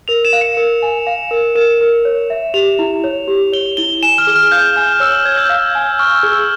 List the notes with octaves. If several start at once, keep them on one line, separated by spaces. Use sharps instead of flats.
A#4 F7
E7
F5
C#7
A#4
G#5
F5
A#4
A#4 E7
A#4
C#5
E5
G4 F7
E4
C#5
G4
C#5 G7
E4 G7
G#5 E7
F6
G#4
F6
F5 G6
G#5 F6
C#5 E6
C#5 G#6
G6
F5
G#5
C#6 F6
E6
G#4
E6